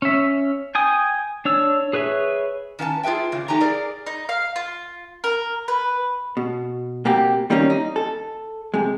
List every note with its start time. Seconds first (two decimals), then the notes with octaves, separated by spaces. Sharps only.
0.02 C#4 E5
0.75 G5 G#5 D#6
1.45 D4 C#5 E6
1.93 G#4 B4 C#5 E5
2.79 D#3 C#4 B4 F#5 A5
3.03 F4 G#4 B4 E5 G5
3.32 A2 C#3 D4
3.48 A3 D#4 G4 G#5 A#5
3.60 G#4 A#4 D5
4.06 D#4
4.29 F5
4.56 F4
5.24 A#4
5.68 B4
6.37 B2
7.05 B2 A#3 C4 G4
7.50 D#3 G3 A#3 C4 C#4 D#4
7.70 D#4
7.96 A4
8.74 C3 G#3